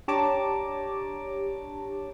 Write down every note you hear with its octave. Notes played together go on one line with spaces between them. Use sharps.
D4 G4 C#5 A5 A#5 D6